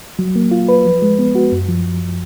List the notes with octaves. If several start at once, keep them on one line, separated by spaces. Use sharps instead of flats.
F#3
A#3
F4
B4
F3
G#3
B3
F#4
F#2
F3